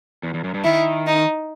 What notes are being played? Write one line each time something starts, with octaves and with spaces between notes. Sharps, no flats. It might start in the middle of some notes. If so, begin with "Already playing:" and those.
E2
E2
F#2
G2
D#3 E4
D#4